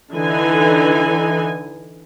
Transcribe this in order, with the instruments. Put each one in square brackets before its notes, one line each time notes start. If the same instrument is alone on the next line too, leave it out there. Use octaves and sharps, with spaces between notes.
[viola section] D3 E3 D#4 G#5